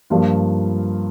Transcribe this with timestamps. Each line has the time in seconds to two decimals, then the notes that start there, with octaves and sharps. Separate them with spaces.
0.10 G2 F3 A#3 F4